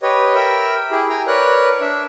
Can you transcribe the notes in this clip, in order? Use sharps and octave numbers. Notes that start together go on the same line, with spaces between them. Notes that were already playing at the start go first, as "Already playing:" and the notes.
G4 B4 C#5 D#5
A#4 E5 G5 B5
E4 G4 G#4
G5 G#5 A#5
A#4 B4 C#5 D5 F#6
D4 E5